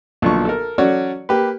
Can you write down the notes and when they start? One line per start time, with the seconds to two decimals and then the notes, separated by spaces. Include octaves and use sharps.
0.22 B1 A#2 D3 F3 C#6
0.45 A4 A#4
0.78 F#3 C#4 F#4 A4 C#5 D5
1.29 A#3 G4 B4